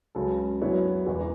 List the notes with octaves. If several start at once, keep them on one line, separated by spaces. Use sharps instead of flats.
C#2 C#3 F#3 C#4 A4
F#2 F#3 B3 E4 C#5
E1 E2 E3